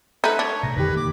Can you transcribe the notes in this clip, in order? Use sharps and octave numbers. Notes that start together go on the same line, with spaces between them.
A3 D#4 B4
D4 C#5
C3 A3 A#5
F2 B2 D3 D#3 G4 B4
A#3 D6